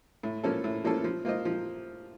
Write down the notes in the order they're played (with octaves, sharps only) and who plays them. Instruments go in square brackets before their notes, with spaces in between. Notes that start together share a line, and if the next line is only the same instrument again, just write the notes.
[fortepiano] A2
F3 A#3 C#4 A4
A2
F3 A#3 C#4 A4
F3
A#3 F4 C5 D#5
F3